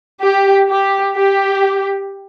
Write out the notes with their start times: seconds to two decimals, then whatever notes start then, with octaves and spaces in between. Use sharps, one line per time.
0.21 G4
0.69 G4
1.17 G4